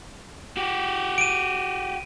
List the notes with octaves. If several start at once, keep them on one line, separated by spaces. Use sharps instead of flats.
F#4 G4
D7 D#7